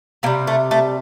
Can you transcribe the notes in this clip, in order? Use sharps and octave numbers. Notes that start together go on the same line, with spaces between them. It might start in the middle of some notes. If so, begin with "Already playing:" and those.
C3 G3 A#3
A3
A3